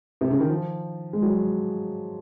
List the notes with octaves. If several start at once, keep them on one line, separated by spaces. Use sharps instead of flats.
C3
C#3
D#3
F3
G#3
F#3